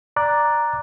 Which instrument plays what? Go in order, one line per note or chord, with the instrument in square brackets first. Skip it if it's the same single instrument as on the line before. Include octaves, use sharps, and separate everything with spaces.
[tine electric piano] D5 A#5 D6 F#6 A6